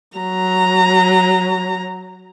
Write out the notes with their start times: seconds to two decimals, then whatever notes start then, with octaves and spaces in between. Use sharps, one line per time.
0.18 F#3 A#5